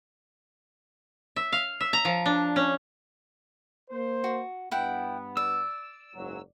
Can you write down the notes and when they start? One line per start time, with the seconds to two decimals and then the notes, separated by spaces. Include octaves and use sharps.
1.36 E5
1.52 F5
1.81 E5
1.93 A#5
2.05 F3
2.26 D4
2.56 C#4
3.91 A#3 C5
4.24 F#4
4.71 G2 B3 E4 F#5 G5
5.37 D5 E6
6.15 F#1 G#2 F#3